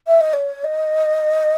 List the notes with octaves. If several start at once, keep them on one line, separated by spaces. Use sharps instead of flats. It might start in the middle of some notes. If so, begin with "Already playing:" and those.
E5
D#5
C#5
D#5